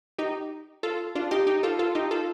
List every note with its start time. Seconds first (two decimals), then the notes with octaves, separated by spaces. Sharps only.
0.18 D#4 G4
0.83 F4 A4
1.15 D4 F4
1.31 D#4 G4
1.47 D#4 G4
1.63 F4 A4
1.79 F4 A4
1.95 D#4 G4
2.11 F4 A4